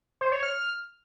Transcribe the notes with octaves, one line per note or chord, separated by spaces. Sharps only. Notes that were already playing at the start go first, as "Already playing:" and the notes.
C5
C#5
F6